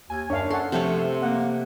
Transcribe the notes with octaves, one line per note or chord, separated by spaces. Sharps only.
D#2 G#5
F#2 D4 C#5 F5
A4 F#5 C6
C3 F3 A3 C4 C#5
A#3 F#5